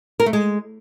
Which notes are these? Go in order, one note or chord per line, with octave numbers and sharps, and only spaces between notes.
A#4
A3
G#3